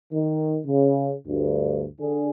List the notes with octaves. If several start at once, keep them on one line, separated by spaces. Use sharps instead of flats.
D#3
C#3
D2 G2
D3 G#4